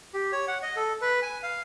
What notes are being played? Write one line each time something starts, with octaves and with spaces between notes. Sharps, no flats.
G4
C#5
F#5
D#5
A4
B4
G#5
F5